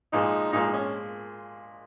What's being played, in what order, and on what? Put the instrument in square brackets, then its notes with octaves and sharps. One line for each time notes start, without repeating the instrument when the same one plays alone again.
[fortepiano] A#2 F3 G#3 [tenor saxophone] D#4
[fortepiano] A#2 F3 G#3 [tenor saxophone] D#4
[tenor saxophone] C#4